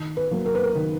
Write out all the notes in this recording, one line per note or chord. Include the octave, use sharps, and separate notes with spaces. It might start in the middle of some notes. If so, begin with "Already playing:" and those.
Already playing: D#3
B4
F#3 A#3
A#4
B4
A#4
D#3